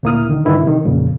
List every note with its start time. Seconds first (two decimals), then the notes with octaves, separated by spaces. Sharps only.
0.03 D2 A#2 A#3 E4 D#6 F6
0.29 D3 D#3
0.45 G2 D3 D#3 E4 B4
0.63 C3 D#3
0.85 F2 A#2 C#3